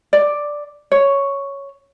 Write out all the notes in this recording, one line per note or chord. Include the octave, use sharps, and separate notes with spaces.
D5
C#5